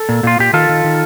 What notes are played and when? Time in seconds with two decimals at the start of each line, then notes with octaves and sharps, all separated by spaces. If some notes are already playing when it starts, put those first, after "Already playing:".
Already playing: A4
0.09 A#2
0.23 A#2 F4
0.39 A#2 G4
0.53 D#3 F4 A4
0.69 D#3
0.84 D#3